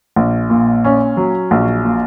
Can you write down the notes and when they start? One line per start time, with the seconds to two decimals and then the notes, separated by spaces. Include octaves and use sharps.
0.16 A#1
0.50 A#2
0.85 C#4
1.17 F#3
1.51 A#1
1.84 A#2